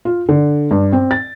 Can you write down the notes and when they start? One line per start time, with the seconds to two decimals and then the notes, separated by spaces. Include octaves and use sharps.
0.05 F4
0.29 D3
0.71 G2
0.93 C4
1.11 A6